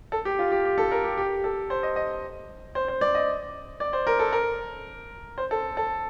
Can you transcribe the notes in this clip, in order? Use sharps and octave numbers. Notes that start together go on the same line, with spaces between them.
A4
G4
F4
G4
G4
A4
A#4
G4
G4
A4
C5
D#5
D#5
C5
C5
D5
D#5
D5
C5
A#4
A4
A#4
C5
A4
A4